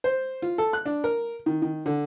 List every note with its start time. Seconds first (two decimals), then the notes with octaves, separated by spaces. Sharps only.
0.04 C5
0.42 F4
0.58 A4
0.73 F#6
0.86 D4
1.04 A#4
1.46 D#3
1.62 D#3
1.86 D3